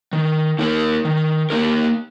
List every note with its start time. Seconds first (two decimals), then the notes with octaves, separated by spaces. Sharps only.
0.13 D#3
0.59 A#3 D#4 A#4
1.05 D#3
1.50 A#3 D#4 A#4